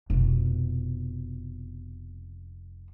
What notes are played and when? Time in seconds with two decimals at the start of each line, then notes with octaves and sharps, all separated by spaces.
0.10 F1 B2